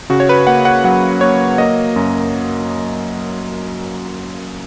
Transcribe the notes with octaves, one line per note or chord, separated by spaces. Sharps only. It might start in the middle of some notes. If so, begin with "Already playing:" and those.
C#3 F#4
C#5
B4
A#3 F#5
F#5
F#3 F#5
A#3 C#5
A#3 D#5
F#2